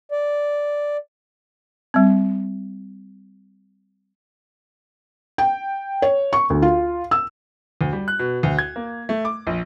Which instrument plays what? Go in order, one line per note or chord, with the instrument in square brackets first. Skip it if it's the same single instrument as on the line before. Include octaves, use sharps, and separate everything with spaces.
[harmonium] D5
[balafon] G3 C4
[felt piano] G5
C#5
C#6
D2
F4
E6
[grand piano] D2
G3
F#6
B2
D2
G#6
A#3
A3
D6
A#1